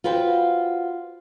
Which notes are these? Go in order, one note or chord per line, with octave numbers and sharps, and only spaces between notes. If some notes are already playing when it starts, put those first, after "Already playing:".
F4 F#4 B4 C5 G5